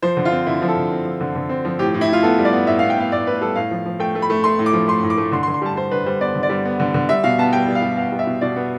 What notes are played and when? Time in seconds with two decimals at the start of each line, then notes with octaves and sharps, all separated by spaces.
0.02 F3 C5
0.17 D3
0.25 F4
0.32 C4
0.47 D3 E4
0.62 F3
0.68 A4
0.77 D3
0.92 C4
1.05 F3
1.21 D3
1.36 D3
1.49 C4
1.65 F3
1.79 A2 G4
1.94 A2
2.01 E4
2.08 A2 F4
2.23 B3 A4
2.38 G3
2.45 D5
2.53 B3
2.67 A2 E5
2.79 F5
2.83 B3
2.90 G5
2.98 B3 F5
3.12 A2 D5
3.27 A2 B4
3.41 G3 A4
3.56 A2 F5
3.71 F3
3.86 F3
4.00 A3 G5
4.15 A3
4.22 B5
4.30 A3
4.44 A3 C6
4.59 A2
4.66 D6
4.73 F3
4.88 A3 C6
5.03 A2
5.10 D6
5.18 A3
5.32 D3 C6
5.43 C6
5.48 D3
5.54 C6
5.62 G3 A5
5.76 G3 C5
5.91 D3 B4
6.06 G3 C5
6.20 B3 D5
6.35 D3
6.43 D5
6.50 G3
6.65 B3
6.80 D3
6.94 D3
7.09 G3 E5
7.24 B2 F5
7.39 B3 A5
7.53 G3 G5
7.68 G3
7.75 F5
7.82 G3
7.97 B3 F5
8.12 G3
8.19 E5
8.27 B2
8.41 B2 D5
8.56 B3